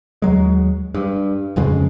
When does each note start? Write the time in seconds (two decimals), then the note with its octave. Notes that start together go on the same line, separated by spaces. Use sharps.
0.22 D#2 F#3 G#3
0.94 G2
1.56 D1 F2 C#3 G#3